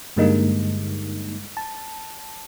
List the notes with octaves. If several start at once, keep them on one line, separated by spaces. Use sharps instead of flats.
G2 D3 G3 G#3 A#3 D#4
A5